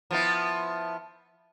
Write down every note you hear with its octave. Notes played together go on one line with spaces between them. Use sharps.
F3 B3 E4